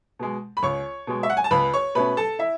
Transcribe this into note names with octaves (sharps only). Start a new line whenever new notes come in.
B2 G#3
B5
C#2 C#5 C#6
B2 G#3
E5
F#5
G#5
A5
C#2 B4 B5
C#5 C#6
B2 A3 C#4 B4 B5
A4 A5
E4 E5